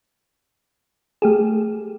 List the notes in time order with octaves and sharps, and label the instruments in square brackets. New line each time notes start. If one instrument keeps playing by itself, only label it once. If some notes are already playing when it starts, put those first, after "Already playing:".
[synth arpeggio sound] A3 G4 G#4